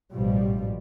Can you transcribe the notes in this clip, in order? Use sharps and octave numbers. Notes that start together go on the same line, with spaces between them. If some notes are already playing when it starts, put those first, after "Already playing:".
A1 G#2 B2 F3 G3